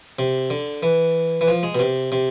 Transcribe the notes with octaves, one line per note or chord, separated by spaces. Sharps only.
C3
D3
E3
E3
F3
G#3
B2
C3
C3